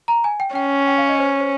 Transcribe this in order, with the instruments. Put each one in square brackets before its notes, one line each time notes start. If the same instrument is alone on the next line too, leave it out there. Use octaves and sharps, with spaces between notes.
[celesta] A#5
G#5
G5
[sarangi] C#4 [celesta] G5
[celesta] G5
F5
D#5
C5
C5